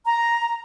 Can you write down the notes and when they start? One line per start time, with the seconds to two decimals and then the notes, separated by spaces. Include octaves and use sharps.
0.06 A#5